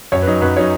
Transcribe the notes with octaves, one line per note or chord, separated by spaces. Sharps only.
F#2 C#5
B4
F#3 D#4
F#2 B4
F#3 D#4 C#5